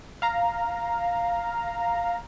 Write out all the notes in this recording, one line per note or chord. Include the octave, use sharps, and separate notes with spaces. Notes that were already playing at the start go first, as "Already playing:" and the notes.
F5 A#5